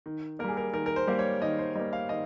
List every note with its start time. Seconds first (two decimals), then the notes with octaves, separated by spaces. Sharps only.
0.06 D#3
0.39 A#3 A#4
0.44 G3 G#4
0.57 A#4
0.73 D#3 A#4
0.86 A#4
0.96 C5
1.07 G3 A#3
1.19 C#5
1.42 D#3 D#5
1.59 C5
1.75 G3 A#3 D#5
1.93 F5
2.09 D#3 D#5